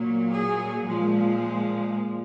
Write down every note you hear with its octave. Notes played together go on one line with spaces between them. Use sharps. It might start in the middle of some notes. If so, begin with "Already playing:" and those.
Already playing: A#2 F#3 A#3
G#4
A#2 F3 G#3